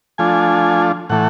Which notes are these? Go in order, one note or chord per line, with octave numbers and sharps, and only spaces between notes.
F3 A3 D4 F4 G#5
A2 E3 A3 F#5